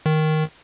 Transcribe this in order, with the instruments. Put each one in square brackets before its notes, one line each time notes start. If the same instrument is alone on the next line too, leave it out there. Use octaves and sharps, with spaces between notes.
[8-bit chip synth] D#3